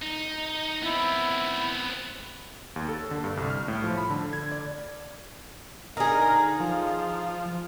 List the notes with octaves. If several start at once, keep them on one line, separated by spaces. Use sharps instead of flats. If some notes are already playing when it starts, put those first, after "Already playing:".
D#4
B3 C4 E4
D#2
A4
D3
G2
C2
F6
A2
F3
B5
D3
G#6
D5
D3 D#4 G#4 A#4
F3 F4